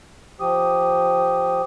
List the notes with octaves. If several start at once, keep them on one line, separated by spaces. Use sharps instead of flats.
F3 G4 D#6